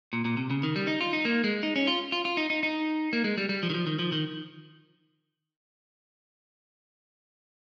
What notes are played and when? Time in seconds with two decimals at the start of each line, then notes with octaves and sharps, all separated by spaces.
0.13 A#2
0.25 A#2
0.37 C3
0.50 C#3
0.63 D#3
0.76 G3
0.87 D#4
1.01 F4
1.13 D#4
1.25 A#3
1.44 G#3
1.63 D#4
1.76 C#4
1.87 F4
2.12 F4
2.25 F4
2.37 D#4
2.50 D#4
2.63 D#4
3.13 A#3
3.24 G#3
3.38 G3
3.49 G3
3.63 F3
3.70 D#3
3.74 F3
3.87 D#3
3.99 F3
4.12 D#3